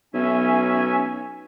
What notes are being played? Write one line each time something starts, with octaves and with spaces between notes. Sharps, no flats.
B1 C#4 E5 G#5